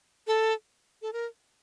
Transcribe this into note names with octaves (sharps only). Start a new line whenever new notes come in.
A4
A4
A#4